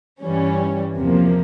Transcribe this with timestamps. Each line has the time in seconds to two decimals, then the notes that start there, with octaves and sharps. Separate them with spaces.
0.22 G2 E3 G3 C#4
0.95 E2 C3 F3 A#3